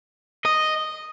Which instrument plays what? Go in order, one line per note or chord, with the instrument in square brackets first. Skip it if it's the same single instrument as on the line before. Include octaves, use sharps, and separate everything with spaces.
[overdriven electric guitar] D#5